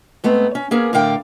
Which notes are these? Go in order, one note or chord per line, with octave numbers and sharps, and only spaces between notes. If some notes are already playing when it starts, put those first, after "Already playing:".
G#2 A3 B3 C4
C#4
A#3 B3 C#4 G#4 A#4
A2 D3 A#4 F5 G5